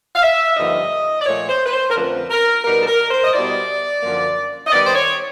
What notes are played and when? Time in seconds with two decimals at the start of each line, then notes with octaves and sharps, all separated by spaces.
0.16 F5
0.22 E5
0.57 G2 D3 F3 A#3 D#4 D#5
1.21 D5
1.26 A#2 F3 A3 C#5
1.49 C5
1.65 B4
1.72 C5
1.90 A#4
1.95 F2 D3 F3 A3 C#4 B4
2.30 A#4
2.65 B2 G3 B3 D#4 A#4
2.82 A4
2.87 A#4
3.11 C5
3.24 D#5
3.34 B2 G3 B3 E4 D5
4.03 F#2 D3 F3 A#3
4.67 D#5
4.72 D#3 G3 B3 D5
4.87 C5
4.95 C#5